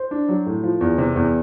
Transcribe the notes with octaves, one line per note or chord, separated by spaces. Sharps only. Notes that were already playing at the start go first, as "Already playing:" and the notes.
Already playing: C5
D4
F#3
A2
F3
E2
C3
E2